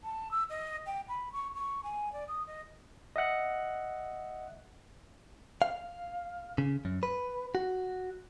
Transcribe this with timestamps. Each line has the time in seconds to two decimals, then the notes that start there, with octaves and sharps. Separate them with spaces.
0.04 A5
0.31 E6
0.50 D#5
0.86 G5
1.09 B5
1.33 C#6
1.55 C#6
1.84 G#5
2.13 D5
2.28 D#6
2.47 D#5
3.16 D#5 E5 F#5 F#6
5.62 F5
6.58 C#3
6.85 F#2
7.03 B4
7.55 F#4